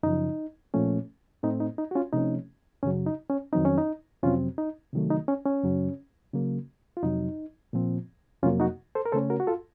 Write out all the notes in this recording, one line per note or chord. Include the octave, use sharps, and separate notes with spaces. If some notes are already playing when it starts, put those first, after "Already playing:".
F#2 C#3 F3 D#4
A#2 F3 A3 C#4
A2 A3 C4 D#4
D#4
D#4
F#4
C#4 F4
C3 F3 A3 C#4 D#4
F#2 C#3 F#3 C#4
D#4
C#4
F2 D#3 F#3 C4 D#4
C#4
D#4
F2 C3 F#3 C4 C#4 F4
D#4
C3 D#3 F#3 A3
D#4
C#4
C#4
F#2 C#3 F#3
C#3 F#3 A#3
F4
F2 C3 F#3 D#4
A#2 F3 C4
F2 C3 F#3 A#3 C#4 F4
D#4 F#4
A4 C5
A#4
C#3 A3 C#4 A4 C5
F#4 A#4
F#4
F4 A4